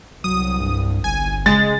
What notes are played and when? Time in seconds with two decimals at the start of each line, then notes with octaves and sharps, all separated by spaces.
0.24 C2 F#3 D#6
0.60 G2
1.04 G1 G#5
1.46 C#3 G#3 A6